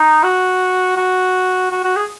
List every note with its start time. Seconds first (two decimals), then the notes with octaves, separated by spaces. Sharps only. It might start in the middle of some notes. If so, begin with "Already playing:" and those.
Already playing: D#4
0.23 F#4
0.97 F#4
1.71 F#4
1.84 F#4
1.96 G#4